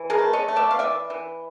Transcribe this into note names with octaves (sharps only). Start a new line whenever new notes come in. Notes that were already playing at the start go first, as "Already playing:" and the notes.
Already playing: E3
G#4 A#4
A3
C#5 D#5
A3
D5 E5
F5
E3 D5 E5
E3